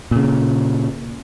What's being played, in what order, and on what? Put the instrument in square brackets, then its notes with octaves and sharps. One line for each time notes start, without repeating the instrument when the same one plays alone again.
[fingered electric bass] A#2 C#3